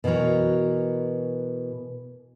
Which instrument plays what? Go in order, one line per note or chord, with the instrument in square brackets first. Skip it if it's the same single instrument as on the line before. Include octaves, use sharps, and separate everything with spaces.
[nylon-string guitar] B2 E3 F#4 A#4 C#5